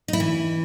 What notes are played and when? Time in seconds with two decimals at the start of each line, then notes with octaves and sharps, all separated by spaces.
0.08 D#4
0.13 E4
0.20 E3